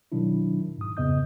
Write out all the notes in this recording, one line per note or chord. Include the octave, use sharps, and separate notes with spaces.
B2 D#3 F#3 D4 E4
G#2 D#6
F2 C#3 B3 D#5 D#6 G6